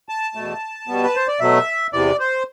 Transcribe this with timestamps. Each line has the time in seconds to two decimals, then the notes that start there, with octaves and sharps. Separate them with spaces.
0.09 A5
0.35 E2 B2 A3
0.88 B2 G3 B3
1.04 B4
1.16 C5
1.28 D5
1.40 B2 F#3 A3 E5
1.93 E2 C3 E3 D5
2.19 C5